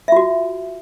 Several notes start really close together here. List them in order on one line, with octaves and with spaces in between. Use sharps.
E5 F4 F#4